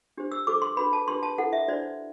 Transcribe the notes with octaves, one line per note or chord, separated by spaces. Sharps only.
D4 G4 C5
E6
F#4 A4 C5 D6
C6
D4 F#4 B4 B5
A5
D4 G4 B4 C6
A5
E4 A4 C5 F#5
E5
D4 F#4 C5 D5